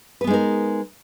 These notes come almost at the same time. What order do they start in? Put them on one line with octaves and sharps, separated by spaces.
B4 B3 G#3 D#4 A#4